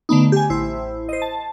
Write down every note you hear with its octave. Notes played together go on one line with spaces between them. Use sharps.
D3 A3 B3 D#4
G4 G#5
A1 E4 C5
C5 D#5
A5